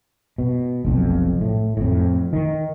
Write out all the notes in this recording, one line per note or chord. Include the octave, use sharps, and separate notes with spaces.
B2
F1 B1 F2
A2
F2 A2
D#3